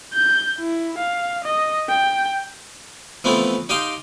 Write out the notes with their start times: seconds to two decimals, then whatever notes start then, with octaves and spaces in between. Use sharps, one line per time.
0.14 G6
0.58 E4
0.98 F5
1.44 D#5
1.89 G5
3.24 E3 F3 A3 B3 C4 E4
3.69 D#4 G4 D#5 F5 G5 C6